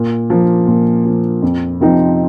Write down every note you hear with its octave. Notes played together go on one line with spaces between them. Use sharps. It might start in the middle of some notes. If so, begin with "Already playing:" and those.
Already playing: A#2
F3 A#3
A#2
F3 A#3
F2
C3 F3 C4 D#4